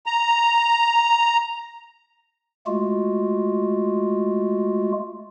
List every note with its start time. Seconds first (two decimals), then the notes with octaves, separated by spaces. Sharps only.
0.06 A#5
2.67 G#3 A3 F4 F#4